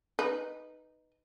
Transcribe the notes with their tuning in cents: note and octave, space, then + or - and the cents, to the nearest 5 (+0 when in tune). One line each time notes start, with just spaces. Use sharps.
D#4 +0 B4 +0